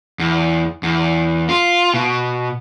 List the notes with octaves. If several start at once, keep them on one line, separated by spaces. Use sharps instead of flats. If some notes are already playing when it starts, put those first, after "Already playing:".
E2
E2
F4
B2